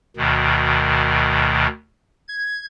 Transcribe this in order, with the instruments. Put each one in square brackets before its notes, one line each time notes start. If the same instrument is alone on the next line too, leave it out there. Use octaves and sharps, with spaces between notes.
[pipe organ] D2 B2 D#3
G#6